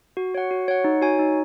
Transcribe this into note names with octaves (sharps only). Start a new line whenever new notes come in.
F#4
C#5 F#5
F#4
C#5 F#5
D#4
F#4 C#5 G#5
D#4